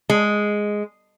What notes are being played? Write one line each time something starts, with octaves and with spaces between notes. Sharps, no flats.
G#3